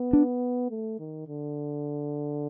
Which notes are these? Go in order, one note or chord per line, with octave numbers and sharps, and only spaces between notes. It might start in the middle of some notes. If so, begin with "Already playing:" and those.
Already playing: B3
D4
A3
D#3
D3